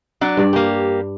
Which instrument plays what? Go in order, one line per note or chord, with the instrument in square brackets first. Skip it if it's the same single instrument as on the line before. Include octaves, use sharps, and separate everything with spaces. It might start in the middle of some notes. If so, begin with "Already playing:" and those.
[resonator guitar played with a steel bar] F#3 D4
[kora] G2 D5
[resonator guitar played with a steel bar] A#3 G4